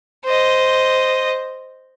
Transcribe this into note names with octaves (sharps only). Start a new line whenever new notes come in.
C5 D#5